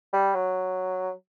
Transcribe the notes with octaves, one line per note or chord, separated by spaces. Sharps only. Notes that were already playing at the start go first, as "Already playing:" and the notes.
G3
F#3